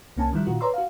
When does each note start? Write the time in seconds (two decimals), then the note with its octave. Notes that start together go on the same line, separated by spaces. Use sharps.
0.17 C2 A#3 C#4 G#5 A5
0.32 D#3 F3 G3 E4 F#6
0.47 A#2 D#3 F4 F#4
0.61 B4 C#5 D5 A#5 C6 E6
0.74 F#4 F5